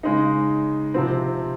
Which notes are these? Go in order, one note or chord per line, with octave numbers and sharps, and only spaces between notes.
C#3 G#3 D#4
C3 F3 C4